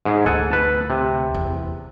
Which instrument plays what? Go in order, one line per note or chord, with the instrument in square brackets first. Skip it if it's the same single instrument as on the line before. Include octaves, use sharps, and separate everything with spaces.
[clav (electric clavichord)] G#2 G#4
[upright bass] D2 [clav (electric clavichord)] A4 F#5 G#5
[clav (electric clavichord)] B4 A5
C3
[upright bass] E2